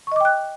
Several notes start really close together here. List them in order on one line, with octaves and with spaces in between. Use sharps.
C#6 D#5 D6 G5 F#6